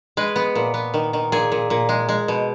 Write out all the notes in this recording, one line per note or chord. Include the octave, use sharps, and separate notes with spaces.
G#3 B4
B3
A#2
B3
D#3
D#3
A#2 G#4
A#2
A#2
G#3
G#3
B2